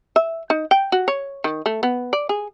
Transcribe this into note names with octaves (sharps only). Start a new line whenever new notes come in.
E5
D#4
G5
F#4
C#5
D#3
A3
B3
D5
G#4